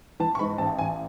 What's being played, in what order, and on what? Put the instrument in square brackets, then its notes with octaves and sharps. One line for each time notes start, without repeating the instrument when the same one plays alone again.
[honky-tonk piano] E3 A5
C#6
G#2 B5
A1 A5
A1 G#5